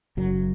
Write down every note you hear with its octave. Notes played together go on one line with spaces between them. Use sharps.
F#1 F#2 F#3